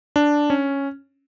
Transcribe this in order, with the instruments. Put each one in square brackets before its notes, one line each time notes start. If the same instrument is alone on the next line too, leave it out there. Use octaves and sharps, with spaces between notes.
[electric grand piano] D4
C#4